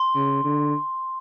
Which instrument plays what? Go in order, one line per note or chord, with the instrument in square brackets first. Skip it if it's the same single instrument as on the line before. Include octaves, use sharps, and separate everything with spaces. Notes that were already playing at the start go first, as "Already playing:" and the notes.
Already playing: [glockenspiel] C6
[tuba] C#3
D3